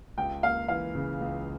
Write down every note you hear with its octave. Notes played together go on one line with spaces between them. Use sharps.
C#2 G5
A#3 F5
E3 F5
C#3
C#2